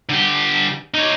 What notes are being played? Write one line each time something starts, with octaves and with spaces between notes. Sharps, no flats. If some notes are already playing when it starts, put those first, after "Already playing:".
D3 G4
D#4 C#5